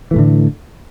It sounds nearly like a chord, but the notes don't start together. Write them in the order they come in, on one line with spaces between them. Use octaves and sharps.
E3 A3 A2 D3